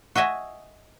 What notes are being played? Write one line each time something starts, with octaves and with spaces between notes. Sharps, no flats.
F#4 D#5 E5 G#5